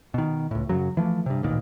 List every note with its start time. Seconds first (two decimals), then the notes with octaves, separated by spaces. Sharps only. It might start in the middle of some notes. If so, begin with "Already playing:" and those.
0.14 B2 D#3
0.51 C#2 A2
0.69 F#2 C#3 F#3
0.97 E3 F3 A3
1.26 G2 C3
1.43 A1 D2 A#2 D#3